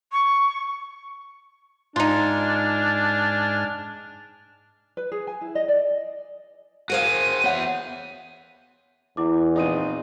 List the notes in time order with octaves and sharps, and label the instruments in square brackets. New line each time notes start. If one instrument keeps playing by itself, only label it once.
[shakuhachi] C#6
[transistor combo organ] G#2 G#5 F6 [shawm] D4 [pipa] D#4 F4
[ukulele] B4
G#4
G#5
E4
D#5
D5
[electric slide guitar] F#4 G#4 [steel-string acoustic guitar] A#4 C5 F5 [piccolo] D#7
[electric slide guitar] B3 E5 [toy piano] C#5 F#5
[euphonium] E2 [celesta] E4 D6
[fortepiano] A#1 C4 D#4 [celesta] F4 D#6 D#7